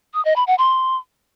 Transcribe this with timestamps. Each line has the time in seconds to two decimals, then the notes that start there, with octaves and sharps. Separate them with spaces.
0.14 D#6
0.25 D#5
0.36 B5
0.47 F#5
0.58 C6